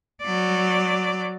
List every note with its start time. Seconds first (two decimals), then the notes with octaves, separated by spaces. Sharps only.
0.22 F#3 D5